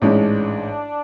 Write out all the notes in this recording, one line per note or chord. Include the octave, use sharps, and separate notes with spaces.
A1 G#2 G#3 C#4 D4